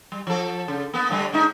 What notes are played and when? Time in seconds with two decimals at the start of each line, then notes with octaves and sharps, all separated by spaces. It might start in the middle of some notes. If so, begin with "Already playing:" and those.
0.12 G3
0.27 F3 A4
0.68 C#3
0.94 A#3 B3
1.10 A2 D3 G3
1.32 D3 G#3 D#4